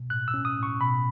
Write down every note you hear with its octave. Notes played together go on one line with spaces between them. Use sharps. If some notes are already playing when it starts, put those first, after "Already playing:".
Already playing: B2
A2 F#6
E6
C#4
D#6
A2
C#6
B2 B5